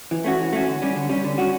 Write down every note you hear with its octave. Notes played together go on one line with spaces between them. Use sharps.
E3
A3 C#4 F#4
E3
A3 C#4 F#4
D3
G3 C#4
D3
G3 C#4
D3
G3 C#4 F#4